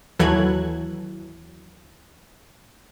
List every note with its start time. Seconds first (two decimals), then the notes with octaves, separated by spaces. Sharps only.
0.19 D#2 E3 F#3 A4 F#6 G#6